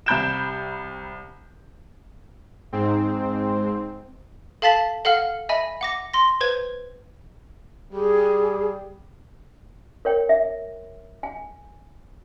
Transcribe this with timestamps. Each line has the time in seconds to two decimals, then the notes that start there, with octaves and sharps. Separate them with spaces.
0.06 C2 C3 B5 G6 D7 E7
2.72 G#2 C4
4.62 A4 F5 A5 A6 B6 F#7
5.05 A4 F5 F#5 F6
5.49 D#5 E5 G#5 B5
5.81 F#5 D6 A#6
6.14 C6 A#6
6.41 B4 C5 G#6
7.93 G3 G#4
10.05 A#4 C#5 G5
10.29 E5
11.23 G#5